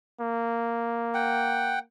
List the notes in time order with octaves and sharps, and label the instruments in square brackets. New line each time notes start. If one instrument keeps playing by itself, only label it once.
[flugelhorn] A#3
[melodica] F#5 G5